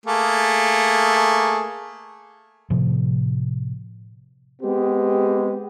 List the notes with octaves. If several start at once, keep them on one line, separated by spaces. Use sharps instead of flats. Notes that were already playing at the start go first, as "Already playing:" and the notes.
A3 A#3 G#4
A2 C3 F3
G#3 B3 C4 G4